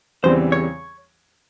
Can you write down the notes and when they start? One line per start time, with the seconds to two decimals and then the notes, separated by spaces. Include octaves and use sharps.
0.23 E2 C#3 E3 G3 C4 C5
0.52 C#5